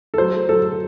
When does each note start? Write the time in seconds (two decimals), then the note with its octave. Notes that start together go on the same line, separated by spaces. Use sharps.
0.14 A4
0.18 F#3 C5
0.49 F#3 A4